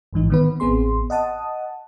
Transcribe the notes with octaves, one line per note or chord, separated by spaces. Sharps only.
A1 G#2 E3 D#4
D#3 B3 B4
A1 B3 C4 G#4 C6
D#5 F#5 A5 D#6